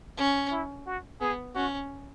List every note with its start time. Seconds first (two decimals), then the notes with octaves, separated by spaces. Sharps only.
0.17 C#4
0.52 E4
0.87 F#4
1.21 B3 G#4
1.55 C#4 F#4